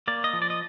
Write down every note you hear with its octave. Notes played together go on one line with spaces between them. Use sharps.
A#3 D5
D#5
F3
D5
D#5